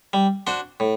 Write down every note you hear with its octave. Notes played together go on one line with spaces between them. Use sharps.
G3
D4 F#4 C5
A2